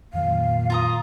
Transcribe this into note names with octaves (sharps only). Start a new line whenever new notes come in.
F2 A#2 D#3 F#3 F5
F4 A#5 D#6